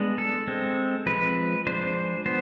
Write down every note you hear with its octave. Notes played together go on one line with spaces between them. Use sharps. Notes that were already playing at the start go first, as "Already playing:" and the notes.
Already playing: G#3 B3 D4
A4
G#3 C4
F3 G#3 C4 B4
F3 G#3 D4 C5
B3 C5